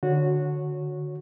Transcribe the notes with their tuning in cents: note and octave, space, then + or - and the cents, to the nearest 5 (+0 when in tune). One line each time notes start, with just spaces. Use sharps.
D3 +10 F#4 -15 C#5 -10